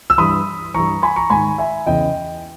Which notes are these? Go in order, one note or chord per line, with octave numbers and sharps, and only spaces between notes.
E6
G2 E3 B5 D#6
G2 E3 A#5 C#6
G#5 B5
A#5 C#6
G#2 D#3 G#5 B5
E5 G#5
E2 C#3 E3 D#5 G5